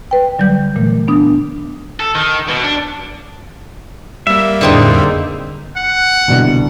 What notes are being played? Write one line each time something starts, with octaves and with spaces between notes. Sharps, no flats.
B4 G5
D3 F#3 G3 G6
A#2 D3 E3 A3
B3 D4 D#6
A4
D#3
B2
D4
G3 A#3 E5
F2 A2 D3 C4 D#4 G#4
F#5
C2 B2 D3